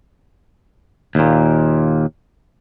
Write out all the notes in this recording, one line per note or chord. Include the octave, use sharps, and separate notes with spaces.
D#2 A#2